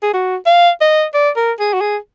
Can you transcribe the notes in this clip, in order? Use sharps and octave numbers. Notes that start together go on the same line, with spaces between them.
G#4
F#4
F5
D#5
D5
A#4
G#4
F#4
G#4